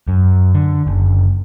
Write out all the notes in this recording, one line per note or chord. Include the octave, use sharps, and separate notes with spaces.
F#2
D3
F#1